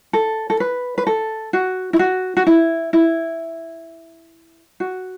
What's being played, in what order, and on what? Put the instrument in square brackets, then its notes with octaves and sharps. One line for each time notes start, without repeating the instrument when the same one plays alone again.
[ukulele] A4
A4
B4
B4
A4
F#4
E4
F#4
F#4
E4
E4
F#4